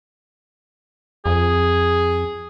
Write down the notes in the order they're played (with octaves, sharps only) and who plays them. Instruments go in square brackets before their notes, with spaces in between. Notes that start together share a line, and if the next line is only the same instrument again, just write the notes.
[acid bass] F2 [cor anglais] G#4